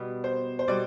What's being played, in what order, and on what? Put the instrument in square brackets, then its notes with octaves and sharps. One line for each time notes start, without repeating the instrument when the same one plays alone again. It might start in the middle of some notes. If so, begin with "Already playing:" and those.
Already playing: [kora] B2 G3 B3
[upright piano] C5
C5
[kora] B2 G3 [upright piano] D5